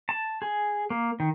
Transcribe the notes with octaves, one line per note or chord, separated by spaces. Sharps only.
A5
G#4
A#3
D#3